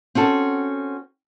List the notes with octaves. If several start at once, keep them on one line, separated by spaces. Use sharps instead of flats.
C4 C#4 F#4 A4